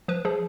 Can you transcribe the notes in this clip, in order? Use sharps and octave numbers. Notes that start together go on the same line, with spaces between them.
F3 B4
F3 G#4